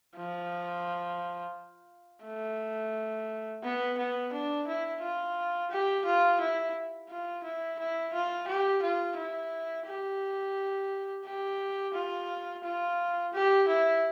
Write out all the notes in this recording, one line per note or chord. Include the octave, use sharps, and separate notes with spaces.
F3
A3
B3
B3
D4
E4
F4
G4
F4
E4
F4
E4
E4
F4
G4
F4
E4
G4
G4
F4
F4
G4
E4